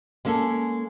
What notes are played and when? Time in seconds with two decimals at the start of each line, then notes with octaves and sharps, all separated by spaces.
0.25 G#3 A#3 C#4 A4